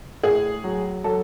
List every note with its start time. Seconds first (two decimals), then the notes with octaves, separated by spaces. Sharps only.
0.23 A2 G#4
0.64 F#3
1.04 F#3 A4